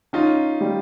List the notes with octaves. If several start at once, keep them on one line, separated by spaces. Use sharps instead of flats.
C#4 D#4 F4
G3